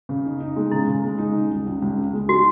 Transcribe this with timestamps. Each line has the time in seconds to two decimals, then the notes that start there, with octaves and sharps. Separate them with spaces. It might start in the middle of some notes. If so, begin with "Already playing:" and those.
0.09 C#3
0.25 D#4
0.40 D#4
0.56 G#3
0.71 C#3 E4
0.87 C#3
1.03 G#3
1.18 D#4
1.35 C#3
1.50 C#2
1.66 C#2
1.82 C#2
1.97 C#3
2.14 G#3
2.29 D#4 F#4